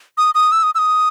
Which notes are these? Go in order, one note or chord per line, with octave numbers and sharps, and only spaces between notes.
D#6
D#6
E6
D#6
E6
D#6